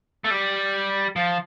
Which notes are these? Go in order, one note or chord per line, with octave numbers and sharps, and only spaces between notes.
A3
G3
F3